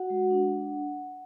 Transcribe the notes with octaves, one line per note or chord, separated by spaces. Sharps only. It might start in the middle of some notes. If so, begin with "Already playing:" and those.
Already playing: F#4 F#5
G#3
D4